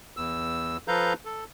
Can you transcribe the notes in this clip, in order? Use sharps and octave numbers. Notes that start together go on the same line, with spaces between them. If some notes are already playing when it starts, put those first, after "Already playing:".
E2 E6
F3 A4 B4 F5 A#5 G6
A4